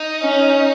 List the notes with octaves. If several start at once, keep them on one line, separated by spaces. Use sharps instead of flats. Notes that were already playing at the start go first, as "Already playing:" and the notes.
Already playing: D#4
C#4